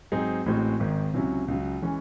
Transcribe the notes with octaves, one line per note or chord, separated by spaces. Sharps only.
G#2 F#3 C4 D#4 G#4
A1 A2 G#3 C4 F#4
G#1 G#2 D#3
C#2 C3 F#3 C#4 E4
C#2 C#3 F#3
E3 G#3 C#4